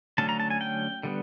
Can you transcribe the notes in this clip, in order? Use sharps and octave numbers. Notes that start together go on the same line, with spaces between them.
D3 F#3 A3 C#4 A5
A#5
A5
G#5
G5
D3 G3 B3